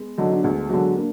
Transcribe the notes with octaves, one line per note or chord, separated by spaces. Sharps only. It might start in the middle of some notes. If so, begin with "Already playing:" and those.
Already playing: G#3 B3
D3 F#3 D#4
D4
D2 G#3 B3
D3 F#3 G#3 B3
A#3 D4